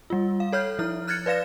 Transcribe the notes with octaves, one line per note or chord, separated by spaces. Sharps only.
G3 F4
F5
A4 C#5 F6 G6
F3 E4 F6
F6 F#6 G#6 A6 C#7
B4 D5 F5 A#6 E7